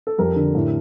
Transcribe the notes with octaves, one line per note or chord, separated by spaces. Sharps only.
A4
F2 G4 A#4
D3
A2